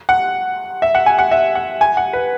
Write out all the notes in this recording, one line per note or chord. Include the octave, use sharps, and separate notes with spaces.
F#5
E5
F#5
G#5
F#5
E5
F#5
G#5
F#5
B4